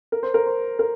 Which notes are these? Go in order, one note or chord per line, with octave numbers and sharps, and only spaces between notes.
A#4
C5
A#4
C5
A#4